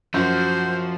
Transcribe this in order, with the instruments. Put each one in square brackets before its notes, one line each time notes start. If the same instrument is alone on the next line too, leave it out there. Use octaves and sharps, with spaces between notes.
[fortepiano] F#2 [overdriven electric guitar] F3 [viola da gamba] F#4 C5 [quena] G6